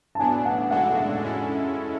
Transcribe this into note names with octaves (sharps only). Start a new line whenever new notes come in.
A5
A2 F#3 B3 D4 G#5
F#5
A2 G#3 D4 F#4 A4 F#5
F#5
G#3 C#4 E4 A4